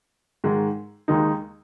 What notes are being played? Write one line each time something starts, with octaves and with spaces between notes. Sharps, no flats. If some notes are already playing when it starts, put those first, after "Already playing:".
G#2 D#3 G#3
D#2 D#3 G#3 D#4